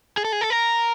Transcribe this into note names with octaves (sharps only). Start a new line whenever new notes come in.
G#4
A4
G#4
A4
A#4